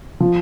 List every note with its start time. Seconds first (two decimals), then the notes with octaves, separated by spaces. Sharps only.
0.20 F3